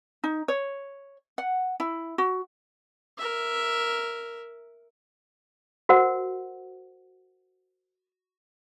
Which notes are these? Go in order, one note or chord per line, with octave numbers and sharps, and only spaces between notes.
D#4
C#5
F#5
E4
F#4
A#4 E5
F#4 A#4 C5 F#5